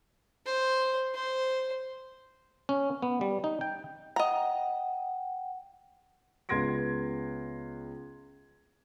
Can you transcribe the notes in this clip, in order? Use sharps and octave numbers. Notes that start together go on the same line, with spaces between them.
C5
C5
C#4
B3
G3
D#4
G5
D#5 F#5 G5 A#5
C#2 B3 C6 G#6 A#6 D7